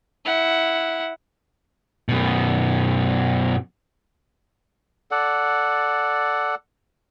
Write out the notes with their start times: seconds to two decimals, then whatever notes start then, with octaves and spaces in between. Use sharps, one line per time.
0.25 E4 F#5
2.09 F#2 B2
5.11 A4 D5 F#5